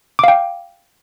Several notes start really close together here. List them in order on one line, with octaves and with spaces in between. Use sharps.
D6 F5 G5